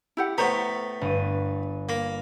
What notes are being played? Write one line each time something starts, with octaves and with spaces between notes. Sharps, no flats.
E4 G4 F#5
A2 B3 C5 A#5
G1 D#7
A#3